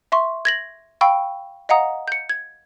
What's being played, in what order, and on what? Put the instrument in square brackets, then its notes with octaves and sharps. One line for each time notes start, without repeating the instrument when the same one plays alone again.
[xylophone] E5 C6 C#6
G#6 A#6 F#7
F5 G5 B5 C#6 E6
D#5 F5 F#5 A#5 D#6
G6 C#7
G#6